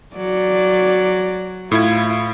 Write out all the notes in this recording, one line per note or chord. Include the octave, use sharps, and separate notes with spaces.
F#3 D5
A2 E4 F4 G#6